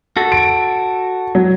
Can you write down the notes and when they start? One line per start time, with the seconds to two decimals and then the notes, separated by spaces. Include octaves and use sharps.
0.17 F#4 A4
0.32 D7
1.35 F#3